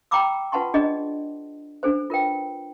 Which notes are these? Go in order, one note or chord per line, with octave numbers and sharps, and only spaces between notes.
G5 A#5 B5 D6 E6
F4 B4 F#5 A5 C6 C#6
D4 G#4 D5 D#5
D4 A4 C5
F4 A#4 B4 G5